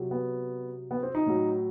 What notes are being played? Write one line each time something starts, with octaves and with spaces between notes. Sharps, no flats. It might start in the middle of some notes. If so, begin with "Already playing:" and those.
Already playing: C3 F#3
B3
B3
C4
D#4
A2 F#3